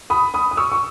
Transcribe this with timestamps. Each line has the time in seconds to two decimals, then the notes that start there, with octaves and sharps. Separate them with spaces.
0.10 B5 D#6
0.34 B5 D#6
0.51 D#6
0.57 C#6 E6
0.72 C#6